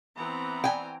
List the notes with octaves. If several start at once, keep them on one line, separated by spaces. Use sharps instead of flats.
E3 B3 C4 A#5
G5 G#5